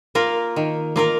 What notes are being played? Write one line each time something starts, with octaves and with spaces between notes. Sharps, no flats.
A#3 F4 A#4
D#3
A#3 F4 A#4